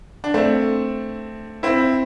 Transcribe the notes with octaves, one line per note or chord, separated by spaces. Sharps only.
D4
A3 C4
C4 E4